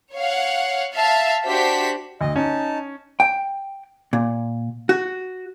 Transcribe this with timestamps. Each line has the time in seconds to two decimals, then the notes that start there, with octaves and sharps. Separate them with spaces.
0.15 C#5 F5 F#5
0.93 E5 F5 A5
1.45 D4 F#4 G4 C5 B6
2.21 D2 D#5
2.36 C#4 D#4 A5
3.20 G5
4.13 A#2
4.89 F#4